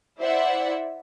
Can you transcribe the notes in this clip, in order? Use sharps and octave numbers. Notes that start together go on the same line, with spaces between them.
E4 C5 D5 E5 F#5